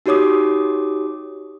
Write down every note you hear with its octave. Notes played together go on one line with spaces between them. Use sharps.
D#4 F#4 G4 C#5 D6 D#6